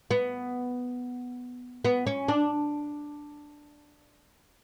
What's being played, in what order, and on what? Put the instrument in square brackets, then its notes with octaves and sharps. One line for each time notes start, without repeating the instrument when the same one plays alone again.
[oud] B3
B3
C#4
D4